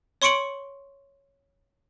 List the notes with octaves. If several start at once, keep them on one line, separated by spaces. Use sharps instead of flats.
C#5 C6 C#6 C#7 D7 F#7